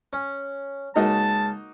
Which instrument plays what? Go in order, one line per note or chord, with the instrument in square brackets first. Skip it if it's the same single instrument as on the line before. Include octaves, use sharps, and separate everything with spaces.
[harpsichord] C#4
[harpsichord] C#2 [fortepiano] A#3 D#4 F#4 [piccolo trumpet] A5